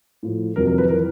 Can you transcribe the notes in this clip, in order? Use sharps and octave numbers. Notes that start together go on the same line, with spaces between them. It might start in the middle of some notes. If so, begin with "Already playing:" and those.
A2 F3
F2 C3 D#3 F#3 A#4
A#4
B4
E3 A#4